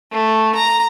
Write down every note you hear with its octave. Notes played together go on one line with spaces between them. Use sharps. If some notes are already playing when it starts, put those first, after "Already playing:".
A3
A#5